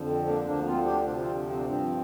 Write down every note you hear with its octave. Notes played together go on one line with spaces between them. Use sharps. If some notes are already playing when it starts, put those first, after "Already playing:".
Already playing: F2 D3 F3
C4
A#3 D4
D2 D3 F3 A#3 D4
C4 F4
D4 G4
D2 C3 F3 D4 G4
G4
C4 F4
C4
D4
G2 F3 C4